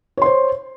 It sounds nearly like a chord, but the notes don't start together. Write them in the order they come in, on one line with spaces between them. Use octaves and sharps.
C#5 C6 C5